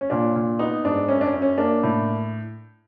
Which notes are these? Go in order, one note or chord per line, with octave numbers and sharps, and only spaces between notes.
C#4
A#2 D4
A#2
B3 D#4
G#2 D4
F#2 C#4
D4
C#4
F#2
C#4
A#3 D4
A2